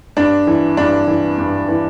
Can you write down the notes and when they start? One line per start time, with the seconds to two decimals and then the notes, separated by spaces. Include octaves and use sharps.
0.17 G2 D4
0.47 E3
0.77 G2 D4
1.08 E3
1.38 G2
1.68 E3